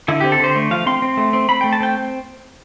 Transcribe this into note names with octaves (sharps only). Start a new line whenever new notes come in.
D3 E4
C4 G4
A4
D3 C5
A3
F3 F5
C4 C6
C4
A3
C4
C4 B5
A3 G5
A5
C4 G5